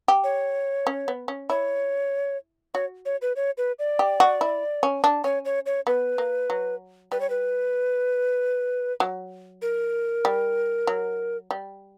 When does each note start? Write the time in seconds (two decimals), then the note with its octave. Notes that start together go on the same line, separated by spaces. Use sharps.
0.08 G4
0.24 C#5
0.87 C#4
1.08 B3
1.28 C#4
1.50 E4 C#5
2.74 F#4 C#5
3.06 C#5
3.22 B4
3.36 C#5
3.58 B4
3.79 D5
3.99 G4
4.20 F#4
4.41 E4
4.83 C#4
5.04 D4
5.24 C#4 C#5
5.45 C#5
5.66 C#5
5.87 B3 B4
6.18 A#3
6.50 F#3
7.12 G3 B4
7.20 C#5
7.30 B4
9.00 F#3
9.62 A#4
10.25 G3
10.87 F#3
11.51 G3